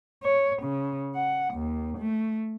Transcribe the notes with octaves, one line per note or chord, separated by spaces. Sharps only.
C#5
C#3
F#5
D#2
A3